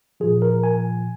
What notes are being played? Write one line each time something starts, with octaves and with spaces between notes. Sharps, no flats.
A#2 F3 G#4
A#4
G#5